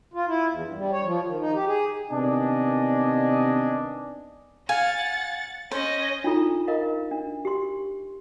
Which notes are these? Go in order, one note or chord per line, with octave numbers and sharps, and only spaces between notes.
F4
E4
E2
G2
G3
C#5
F3
D#3
D#4
G4
G#4
C3 D#3 B3 D4 D#5 G#5
F5 F#5 G#5 A6
C#4 C5 D#5
D4 D#4 F4 A4 A#5
A#4 D#5 F5 A#5
D4
G4 C6